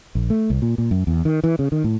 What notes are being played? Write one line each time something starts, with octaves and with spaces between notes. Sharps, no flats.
A#1
A3
C2
A#2
A#2
F#2
E2
D#3
E3
C#3
D#3
A2